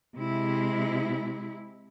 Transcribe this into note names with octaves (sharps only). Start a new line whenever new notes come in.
C3 G#3 E4